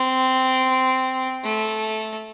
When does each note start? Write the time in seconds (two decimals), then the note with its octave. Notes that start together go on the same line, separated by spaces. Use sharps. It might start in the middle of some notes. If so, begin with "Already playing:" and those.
Already playing: C4
1.44 A3